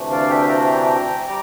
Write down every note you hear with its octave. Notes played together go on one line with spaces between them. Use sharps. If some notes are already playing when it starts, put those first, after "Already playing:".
Already playing: D2 C3 E3 A3 D4
D5 F5
E5 G5
G5 A#5
G3 A#5 D6